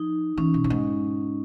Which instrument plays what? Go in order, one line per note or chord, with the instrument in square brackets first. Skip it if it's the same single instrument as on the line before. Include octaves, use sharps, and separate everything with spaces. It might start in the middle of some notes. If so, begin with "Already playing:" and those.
Already playing: [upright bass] F3 [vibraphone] D#4
[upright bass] E3 [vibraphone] C#4
[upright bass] B2
A2
G#2